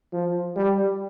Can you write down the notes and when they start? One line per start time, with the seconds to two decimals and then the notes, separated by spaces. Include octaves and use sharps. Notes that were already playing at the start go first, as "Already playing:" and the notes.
0.13 F3
0.56 G3